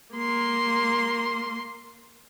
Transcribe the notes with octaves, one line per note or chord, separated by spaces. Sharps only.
A#3 C6